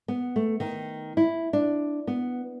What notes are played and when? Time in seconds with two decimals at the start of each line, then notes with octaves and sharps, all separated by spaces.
0.08 B3
0.36 A3
0.60 D#3
1.17 E4
1.53 D4
2.07 B3